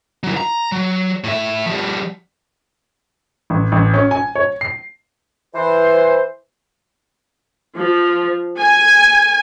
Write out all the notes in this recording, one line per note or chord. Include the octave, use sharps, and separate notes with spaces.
F#3 E4
A#5
F#3
A2 E5
F3 G3
A1
A1
C#4
G#5
C#5
C7
E3 C5
F3
G#5